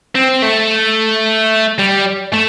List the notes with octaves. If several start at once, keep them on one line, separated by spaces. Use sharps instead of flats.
C4
A3
G3
A3